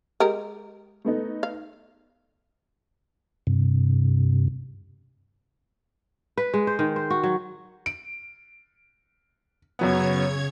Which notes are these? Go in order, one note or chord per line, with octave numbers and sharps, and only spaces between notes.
G#3 G4 A#4
A3 B3 D#4
F5
G2 C3
B4
G#3
C5
D#3
C5
F#4
F#3
D7
F#2 C#3 F#3 B3 C#5 G#6